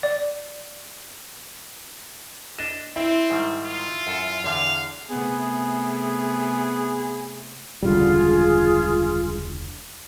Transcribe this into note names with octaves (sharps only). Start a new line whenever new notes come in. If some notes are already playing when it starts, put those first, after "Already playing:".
D5
D4 D#5 E7
C4 E4
G#2 D#3 G3
F4
F#2 A4
E2 D3 F5
C3 A3 B3 G#4
E1 C#2 D3 G3 F4 G#4